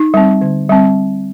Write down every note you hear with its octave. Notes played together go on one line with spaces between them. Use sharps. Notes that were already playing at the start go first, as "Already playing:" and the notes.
Already playing: D#4
G3 C4
D3
G3 C4